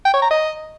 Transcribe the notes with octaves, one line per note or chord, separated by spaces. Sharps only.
G5
C#5
A#5
D#5